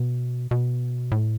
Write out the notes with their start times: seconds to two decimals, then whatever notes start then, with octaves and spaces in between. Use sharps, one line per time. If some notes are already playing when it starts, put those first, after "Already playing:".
Already playing: B2
0.51 B2
1.12 A2